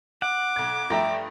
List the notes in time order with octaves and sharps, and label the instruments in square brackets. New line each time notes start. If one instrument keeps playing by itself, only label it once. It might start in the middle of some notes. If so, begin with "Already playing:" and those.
[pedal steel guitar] F#5 [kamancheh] D6
[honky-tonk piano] B1 G#6
[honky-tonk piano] G2 F3 A3 [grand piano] E5 G5 A#5